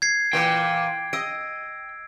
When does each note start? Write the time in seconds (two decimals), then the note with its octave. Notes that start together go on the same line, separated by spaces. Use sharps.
0.02 G#6 C7
0.33 A#2 E3 G5
1.13 D#5 E6 D7